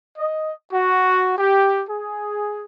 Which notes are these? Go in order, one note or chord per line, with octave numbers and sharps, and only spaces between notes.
D#5
F#4
G4
G#4